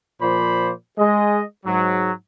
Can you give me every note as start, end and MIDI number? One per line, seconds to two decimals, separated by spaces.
0.21 0.71 46
0.21 0.71 53
0.21 0.71 72
0.21 0.71 74
0.21 0.71 83
0.98 1.42 56
0.98 1.42 75
1.65 2.11 44
1.65 2.11 54